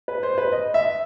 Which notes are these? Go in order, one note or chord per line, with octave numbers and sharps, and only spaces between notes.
B4
C5
B4
D#5
E5